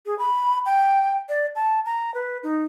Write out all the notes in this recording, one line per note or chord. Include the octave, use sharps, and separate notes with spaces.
G#4
B5
G5
D5
A5
A#5
B4
D#4